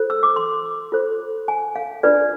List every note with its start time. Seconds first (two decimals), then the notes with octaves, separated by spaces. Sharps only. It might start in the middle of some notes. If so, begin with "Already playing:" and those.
Already playing: F4 A4 C5
0.10 E6
0.23 D6
0.36 C6
0.92 F4 A4 C5
1.48 G#5
1.76 F5
2.03 D4 F4 B4 D5